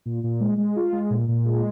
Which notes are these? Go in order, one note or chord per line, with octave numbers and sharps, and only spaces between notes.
A#2
A#2
G#3
G#3
F4
G#3
A#2
A#2
G#3